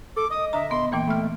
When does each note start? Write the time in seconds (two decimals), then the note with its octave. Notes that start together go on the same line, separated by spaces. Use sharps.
0.16 A4 D6
0.30 D#5 D#6
0.53 D3 D4 E5 A#5
0.71 A#2 B3 C6
0.92 A#2 E3 A#3 G5
1.07 A3 B5 F6